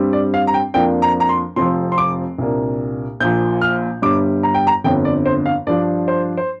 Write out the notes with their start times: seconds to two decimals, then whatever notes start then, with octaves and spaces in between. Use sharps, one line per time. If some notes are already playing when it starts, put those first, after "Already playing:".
Already playing: G2 G3 C4
0.13 D5
0.34 F5
0.47 A#5
0.54 G5
0.74 F2 F3 A#3 D4 G5
1.02 A#5
1.20 A#5
1.29 C6
1.56 F1 F2 F3 C4 C6
1.92 C6
1.98 D6
2.38 C2 A#2 A#3 D4
3.20 A#1 A#2 F3 G6
3.61 F6
4.02 G1 G2 G3 D6
4.43 A#5
4.54 G5
4.67 A#5
4.84 G1 F2 D3 G5
5.05 D5
5.26 C5
5.46 F5
5.67 G2 F3 D4 D5
6.08 C5
6.37 C5